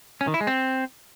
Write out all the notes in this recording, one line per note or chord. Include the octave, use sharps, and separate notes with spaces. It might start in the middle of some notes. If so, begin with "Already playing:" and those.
C#4
D#3
E4
G#3
C4